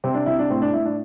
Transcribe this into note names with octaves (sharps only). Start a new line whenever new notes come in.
C3 C4
D4
C3 E4
D4
A2 C4
D4
A2 E4
D4